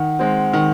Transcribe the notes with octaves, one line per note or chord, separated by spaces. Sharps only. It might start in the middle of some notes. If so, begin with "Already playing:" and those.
Already playing: D#3 F#5
G#3 C4
D#3